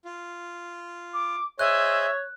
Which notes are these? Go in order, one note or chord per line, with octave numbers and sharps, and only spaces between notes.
F4
D6
G#4 C5 C#5 D#5 E5 F#6